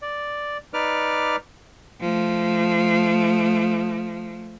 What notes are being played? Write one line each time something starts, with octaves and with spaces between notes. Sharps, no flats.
D5
D#4 B4 D5 D6 F6
F3 A3